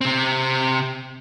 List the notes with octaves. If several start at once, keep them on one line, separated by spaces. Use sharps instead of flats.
C3 C4